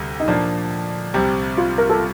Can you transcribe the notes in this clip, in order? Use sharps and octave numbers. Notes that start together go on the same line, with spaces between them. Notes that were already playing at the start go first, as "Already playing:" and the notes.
Already playing: D2 C3 G3
D#4
A#2 F3 A#3 D4
C2 C3 G3 C4
F4
A#4
A4